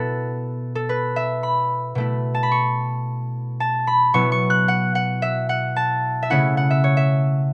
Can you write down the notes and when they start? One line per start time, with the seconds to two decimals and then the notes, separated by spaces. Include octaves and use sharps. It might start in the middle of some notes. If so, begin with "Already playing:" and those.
Already playing: B2 B3 E4 A4
0.75 A4
0.89 B4
1.16 E5
1.43 B5
1.95 B2 A3 E4
2.35 A5
2.43 B5
2.51 C#6
3.60 A5
3.87 B5
4.13 B2 F#3 B3 E4 C#6
4.32 C#6
4.50 F#6
4.68 F#5
4.95 F#5
5.22 E5
5.49 F#5
5.76 A5
6.22 E5
6.30 C#3 A3 C#4 E4 F#5
6.57 F#5
6.70 E5
6.84 C#5
6.97 E5